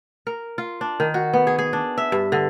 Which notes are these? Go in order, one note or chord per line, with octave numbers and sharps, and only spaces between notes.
A#4
F4
D4
D#3
F#4
B3
G#4
G#4
D4
E5
G2
D3